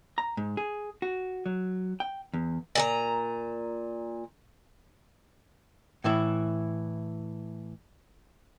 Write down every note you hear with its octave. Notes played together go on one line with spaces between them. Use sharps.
A#5
G#2
G#4
F#4
F#3
G5
E2
A#2 G#4 A#5
A2 E3 E4